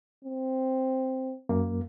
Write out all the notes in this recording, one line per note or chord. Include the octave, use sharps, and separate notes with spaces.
C4
F#2 A#3